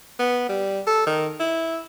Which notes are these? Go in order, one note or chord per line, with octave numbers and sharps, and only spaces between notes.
B3
G3
A4
D#3
E4